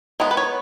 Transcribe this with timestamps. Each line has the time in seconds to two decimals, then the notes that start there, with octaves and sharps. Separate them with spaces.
0.20 D#3 G#3 B3 A#5
0.31 B4
0.37 C#5